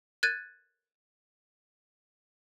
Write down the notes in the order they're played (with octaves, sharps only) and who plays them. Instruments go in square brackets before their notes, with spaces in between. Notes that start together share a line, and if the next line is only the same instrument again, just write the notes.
[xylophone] F#6 G#6 A6 D#7